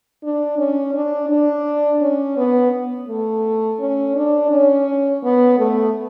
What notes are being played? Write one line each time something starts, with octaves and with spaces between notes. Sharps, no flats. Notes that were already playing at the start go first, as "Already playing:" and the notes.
D4
C#4
D4
D4
C#4
B3
A3
C#4
D4
C#4
B3
A3